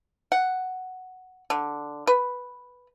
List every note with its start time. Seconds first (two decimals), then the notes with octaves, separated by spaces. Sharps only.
0.32 F#5
1.50 D3
2.07 B4